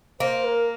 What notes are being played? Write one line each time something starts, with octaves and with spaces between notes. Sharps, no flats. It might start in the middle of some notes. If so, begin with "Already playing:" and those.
A#3 C5
A#4